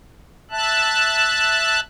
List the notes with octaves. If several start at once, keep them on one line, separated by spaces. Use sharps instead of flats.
E5 A5 F#6